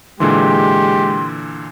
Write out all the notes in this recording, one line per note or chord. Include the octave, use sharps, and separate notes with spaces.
A#2 D3 E3 G#3 G4 C6